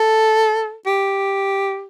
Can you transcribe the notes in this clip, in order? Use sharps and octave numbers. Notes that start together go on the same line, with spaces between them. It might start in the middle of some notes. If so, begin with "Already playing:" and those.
Already playing: A4
G4